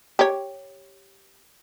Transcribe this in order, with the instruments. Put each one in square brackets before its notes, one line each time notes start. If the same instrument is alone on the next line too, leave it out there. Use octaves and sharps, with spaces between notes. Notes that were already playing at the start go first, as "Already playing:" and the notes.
[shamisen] G4 C#5